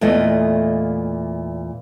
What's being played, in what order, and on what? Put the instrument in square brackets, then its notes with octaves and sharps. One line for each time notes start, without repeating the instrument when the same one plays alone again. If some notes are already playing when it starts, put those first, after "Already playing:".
[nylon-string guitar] E2 A#2 A3 D#5